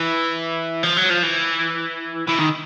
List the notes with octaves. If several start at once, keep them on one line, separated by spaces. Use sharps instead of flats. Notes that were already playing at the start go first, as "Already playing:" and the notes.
Already playing: E3
F3
F#3
F3
E3
E3
D#3